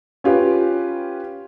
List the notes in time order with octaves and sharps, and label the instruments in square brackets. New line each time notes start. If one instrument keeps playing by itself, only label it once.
[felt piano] C#4 F4 G4 B4